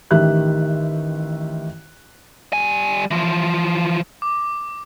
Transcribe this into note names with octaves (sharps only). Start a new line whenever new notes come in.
A1 D#3 G4 E5 F#6
G3 G#5
E3 F3
D6